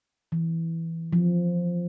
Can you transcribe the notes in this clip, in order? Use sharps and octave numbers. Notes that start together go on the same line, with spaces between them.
E3
F3